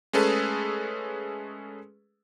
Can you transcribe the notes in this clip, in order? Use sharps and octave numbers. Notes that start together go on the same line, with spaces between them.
G#3 A3 C#4 G#4 A4 B4